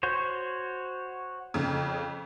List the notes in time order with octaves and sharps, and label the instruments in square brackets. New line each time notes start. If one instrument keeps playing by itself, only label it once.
[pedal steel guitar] F#4 C5 C#5
[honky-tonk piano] F2 C#3